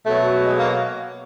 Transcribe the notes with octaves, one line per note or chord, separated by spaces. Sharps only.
B2 F#3 A3
G#3
A#3